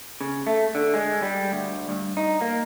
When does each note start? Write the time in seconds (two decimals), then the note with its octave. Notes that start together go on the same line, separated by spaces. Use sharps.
0.21 C#3
0.47 A3
0.75 D3
0.94 G#3
1.22 G3
1.52 D2
1.89 G2
2.17 D#4
2.41 A#3